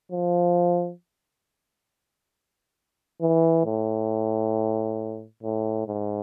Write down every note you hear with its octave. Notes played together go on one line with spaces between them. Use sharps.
F3
E3
A2
A2
G#2